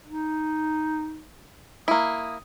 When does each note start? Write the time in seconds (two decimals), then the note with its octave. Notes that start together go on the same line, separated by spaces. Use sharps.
0.07 D#4
1.88 A#3 E4 D#6